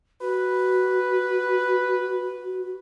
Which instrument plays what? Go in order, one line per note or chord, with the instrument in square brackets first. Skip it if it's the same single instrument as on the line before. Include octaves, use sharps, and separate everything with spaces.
[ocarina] F#4 [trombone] B4